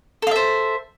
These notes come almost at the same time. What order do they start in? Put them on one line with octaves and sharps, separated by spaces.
A4 F5 E5 C5